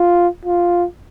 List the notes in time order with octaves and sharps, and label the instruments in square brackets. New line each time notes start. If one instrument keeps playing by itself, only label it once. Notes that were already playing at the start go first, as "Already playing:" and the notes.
Already playing: [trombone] F4
F4